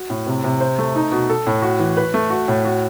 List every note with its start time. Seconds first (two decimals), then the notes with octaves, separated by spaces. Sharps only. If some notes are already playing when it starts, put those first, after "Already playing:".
Already playing: F#4
0.10 A2
0.27 C3
0.44 C3
0.60 C5
0.79 A3
0.96 D#4
1.12 B2
1.30 A4
1.47 A2
1.62 F#4
1.79 E3
1.97 B4
2.14 A3
2.30 F#4
2.48 A2
2.65 F#4